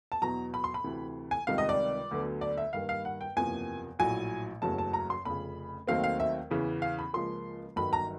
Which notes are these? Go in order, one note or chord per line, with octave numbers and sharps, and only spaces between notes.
A5
E2 B2 F#3 A#5
B5
C6
B5
D2 C3 E3 A3
G#5
C#2 C3 D#3 G3 F5
D#5
D5
D2 D3 F#3 B3
D5
E5
G2 D#3 G3 A#3 F5
F5
F#5
G5
F#1 E2 C3 F3 A#3 G#5
A#1 A2 F#3 G#5
F#1 E2 C#3 F#3 A3 A5
A5
A#5
C6
F1 F2 C#3 B5
D#2 D#3 F#3 A3 C4 F5
F5
E5
E2 C#3 E3
F5
B5
C#2 C#3 F3 A#3 C6
G1 G2 D#3 F#3 B5
A#5